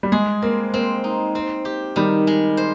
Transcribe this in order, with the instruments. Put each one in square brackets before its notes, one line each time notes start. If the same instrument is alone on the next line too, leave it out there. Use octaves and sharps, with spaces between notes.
[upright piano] G3
[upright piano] G#3 [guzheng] G#4
[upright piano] A#3 [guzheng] C4
[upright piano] A#3 [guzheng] C4
[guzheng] D#4
C4
G4
[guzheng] D#3 [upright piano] G3
[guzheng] G#3
C5